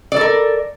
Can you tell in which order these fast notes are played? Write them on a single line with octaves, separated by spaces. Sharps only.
D5 A4 A#4